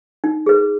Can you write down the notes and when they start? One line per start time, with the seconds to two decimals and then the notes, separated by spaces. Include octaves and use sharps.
0.24 D#4
0.46 G#4 B4